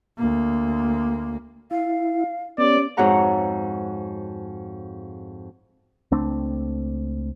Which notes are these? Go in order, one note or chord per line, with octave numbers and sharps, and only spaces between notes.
D2 A#3
E4 F5
B3 C#4 G4 C#5 D5
F2 G#2 F#4 C#5 F#5 A#5
C#2 A3 C4 D4